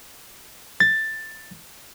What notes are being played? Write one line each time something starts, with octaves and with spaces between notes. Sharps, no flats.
A6